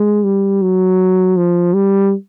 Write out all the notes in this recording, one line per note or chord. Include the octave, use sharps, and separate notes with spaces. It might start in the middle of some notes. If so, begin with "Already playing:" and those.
Already playing: G#3
G3
F#3
F3
G3